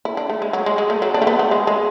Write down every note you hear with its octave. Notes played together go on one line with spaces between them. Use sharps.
E4
D4
A3
G#3
F#3
G#3
G#3
A3
F#3
D4
A3
B3
A3
G#3
G#3